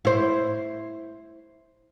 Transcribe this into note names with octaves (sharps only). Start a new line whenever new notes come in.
E4 C5